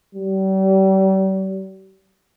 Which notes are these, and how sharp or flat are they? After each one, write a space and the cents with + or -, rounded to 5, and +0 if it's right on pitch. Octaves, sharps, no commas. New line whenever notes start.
G3 -40